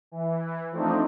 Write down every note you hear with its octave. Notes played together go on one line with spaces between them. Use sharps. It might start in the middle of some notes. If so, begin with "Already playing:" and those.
E3
F3 A3 C4 D4 D#4